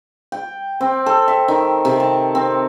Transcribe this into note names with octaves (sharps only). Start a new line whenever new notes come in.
G5
C4
A4
E5
D#3
C3
A5
C4